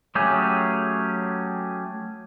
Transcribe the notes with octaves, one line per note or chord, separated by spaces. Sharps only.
F#3 A3 C#4 G4 G#4